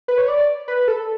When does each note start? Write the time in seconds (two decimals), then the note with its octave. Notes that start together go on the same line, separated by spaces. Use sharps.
0.08 B4
0.18 C#5
0.28 D5
0.68 B4
0.88 A4